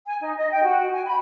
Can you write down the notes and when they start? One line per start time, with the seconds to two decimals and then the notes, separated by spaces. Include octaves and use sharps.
0.07 G#5
0.20 D#4
0.36 D#5
0.50 G5
0.63 F#4
0.91 G#5
1.05 B5